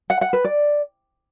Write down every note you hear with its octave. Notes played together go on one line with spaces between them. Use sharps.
F#5
F#5
B4
D5